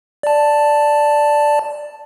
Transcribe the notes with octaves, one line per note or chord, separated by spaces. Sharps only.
D5 A5